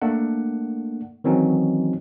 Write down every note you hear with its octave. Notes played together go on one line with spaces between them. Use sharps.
A3 A#3 D4 F#5
D#3 E3 F#3 C4 C#4 D#4